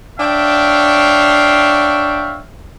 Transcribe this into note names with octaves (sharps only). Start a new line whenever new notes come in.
D4 C#5 E5 F5 G5